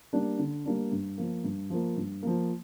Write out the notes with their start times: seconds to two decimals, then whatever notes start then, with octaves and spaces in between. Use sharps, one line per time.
0.13 G3 A#3 D4
0.39 D3
0.65 G3 A#3 D4
0.92 G2
1.18 F3 A#3
1.44 G2
1.70 F3 A#3
1.97 G2
2.23 F3 A#3